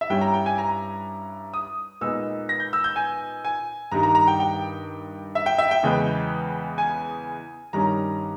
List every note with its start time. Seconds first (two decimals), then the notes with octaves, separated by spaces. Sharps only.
0.01 E5
0.10 G2 G3 C#4 E4 G5
0.21 A#5
0.34 G5
0.46 G#5
0.58 A#5
1.54 D#6
2.01 A#2 G#3 B3 D#4 E6
2.49 A#6
2.60 G6
2.73 E6
2.84 G6
2.96 G#5
3.45 G#5
3.91 G2 D#3 G3 A#5
4.03 A#5
4.15 A#5
4.28 G5
4.40 G5
5.35 E5
5.46 G5
5.58 E5
5.71 G5
5.83 E2 C#3 G#3 B3
6.78 G#5
7.73 G2 D#3 G3 C#4 A#5